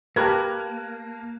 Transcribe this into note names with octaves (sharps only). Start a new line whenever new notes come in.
A#3 G4 A#4 B4 A5 F#6 G#6